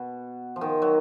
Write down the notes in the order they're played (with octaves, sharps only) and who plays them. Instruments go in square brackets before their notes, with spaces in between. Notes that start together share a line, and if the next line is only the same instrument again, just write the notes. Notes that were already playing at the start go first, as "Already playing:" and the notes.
Already playing: [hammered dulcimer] B2
F3
D#3
F#3